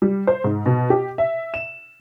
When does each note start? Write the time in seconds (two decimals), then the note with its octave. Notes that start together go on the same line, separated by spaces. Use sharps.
0.02 G3
0.27 C5
0.44 G#2
0.66 B2
0.90 G4
1.18 E5
1.54 E7